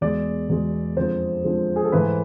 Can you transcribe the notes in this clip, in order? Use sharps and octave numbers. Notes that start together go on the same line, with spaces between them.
E2 B2 G#3 D5
E2 B2 G#3
F2 D3 F3 G#3 C5
F2 D3 F3 G#3
G#4
A4
G#2 E3 A3 B4